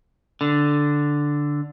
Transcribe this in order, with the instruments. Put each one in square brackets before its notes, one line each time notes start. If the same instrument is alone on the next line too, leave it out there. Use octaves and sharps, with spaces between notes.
[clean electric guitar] D3